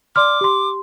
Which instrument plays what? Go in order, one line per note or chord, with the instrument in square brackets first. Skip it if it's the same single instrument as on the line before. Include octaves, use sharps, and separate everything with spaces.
[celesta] D5 C6 F6 [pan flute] D6
[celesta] G4 C6